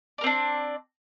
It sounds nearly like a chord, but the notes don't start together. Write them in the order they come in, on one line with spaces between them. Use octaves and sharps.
D5 A#4 C4 D4